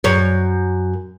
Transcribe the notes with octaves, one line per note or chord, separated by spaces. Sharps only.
F#2 C#5